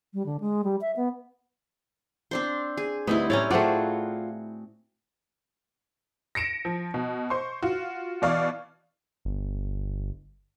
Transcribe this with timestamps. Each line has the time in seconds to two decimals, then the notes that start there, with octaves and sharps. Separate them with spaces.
0.14 G3
0.26 D3
0.40 G#3
0.64 G3
0.81 E5
0.96 B3
2.31 C4 D4 C5
2.77 G#4
3.07 D2 G3 C4 D#4 E4 B4
3.30 A2 C#4 C#5 D5 G5 A#5
3.51 A3 C4 F4 F#4 G#4 D5 F5 F#5
6.35 A#6 C#7 D7 E7
6.65 F3
6.94 B2
7.30 C5 C6 C#6
7.63 F4 F#4
8.22 B2 E3 D5 F5 C#6 F6
9.25 G1